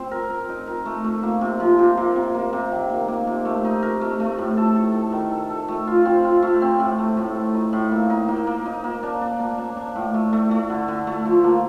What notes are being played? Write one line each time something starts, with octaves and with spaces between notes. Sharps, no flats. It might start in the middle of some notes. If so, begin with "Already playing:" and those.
Already playing: C4
A#4
A#4
D#4
A#4
A3
A3
A#3
C3
F3
C3
A#3
C3
A#3
C3
D#3
A#3
A#3
C3
A3
D#4
A#4
A3
A3
A2
A4
A4
A4
D#3
A4
A4
A3
F4
C4
F4
A3
C4
A2
A3
A2
A3
D#4
A2
A#3
D#4
A#3
A#3
D#4
A#3
D4
D4
A#3
D4
D4
A2
A3
A3
A3
D3
D3
A3
F3
A#3